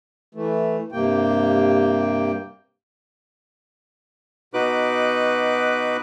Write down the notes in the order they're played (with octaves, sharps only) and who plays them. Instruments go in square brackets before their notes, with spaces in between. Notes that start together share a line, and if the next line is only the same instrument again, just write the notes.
[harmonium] E3 A3
G2 C3 A#3 G5
[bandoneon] B2 D#4 F#4 B4 D6 F#6